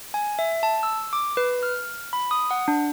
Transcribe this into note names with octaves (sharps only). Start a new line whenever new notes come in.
G#5
E5
A5
E6
D6
B4
F6
B5
D#6
F#5
D4